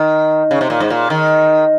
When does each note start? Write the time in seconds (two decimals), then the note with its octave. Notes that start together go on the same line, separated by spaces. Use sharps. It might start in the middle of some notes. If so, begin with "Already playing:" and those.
Already playing: D#3
0.51 C#3
0.61 C3
0.70 A#2
0.80 G#2
0.90 A#2
1.10 D#3